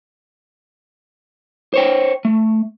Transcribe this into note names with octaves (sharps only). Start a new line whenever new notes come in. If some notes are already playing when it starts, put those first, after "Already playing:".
C5 C#5 G5
A3